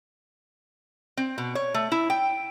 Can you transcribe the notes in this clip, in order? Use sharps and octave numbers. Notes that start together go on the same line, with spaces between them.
C4
B2
C#5
A3
E4
G5